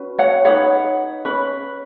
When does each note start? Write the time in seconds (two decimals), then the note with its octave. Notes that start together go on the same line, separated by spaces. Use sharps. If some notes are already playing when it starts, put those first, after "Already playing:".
Already playing: C#4 F#4 B4
0.18 C#5 F#5
0.45 D#4 G#4 B4 C#5 F#5
1.25 C#4 B4